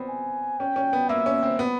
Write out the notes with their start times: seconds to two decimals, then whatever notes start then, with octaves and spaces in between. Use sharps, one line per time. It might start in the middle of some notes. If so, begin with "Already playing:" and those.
Already playing: B3 C4
0.09 G#5
0.59 C#4 G5
0.76 C#4
0.93 B3
1.09 A#3 E5
1.26 C#4
1.43 C4
1.59 B3